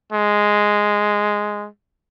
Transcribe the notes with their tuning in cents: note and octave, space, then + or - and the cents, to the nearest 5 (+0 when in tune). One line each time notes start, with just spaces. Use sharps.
G#3 +0